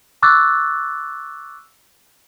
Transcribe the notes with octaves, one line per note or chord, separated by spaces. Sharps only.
C#6 D6 E6 F#6 A6